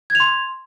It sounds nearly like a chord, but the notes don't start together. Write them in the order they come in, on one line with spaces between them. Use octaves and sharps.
G#6 F7 C6